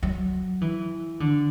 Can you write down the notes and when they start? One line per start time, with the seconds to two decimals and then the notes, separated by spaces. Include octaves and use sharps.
0.03 F#3
0.61 E3
1.20 D3